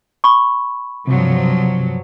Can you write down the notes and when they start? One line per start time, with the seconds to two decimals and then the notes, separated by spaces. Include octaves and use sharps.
0.24 B5 C#6
1.07 G2 C3 F3 F#3